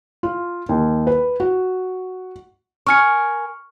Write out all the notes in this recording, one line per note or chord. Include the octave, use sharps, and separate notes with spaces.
F4
D#2
B4
F#4
A#4 G#5 C#6 F6 C#7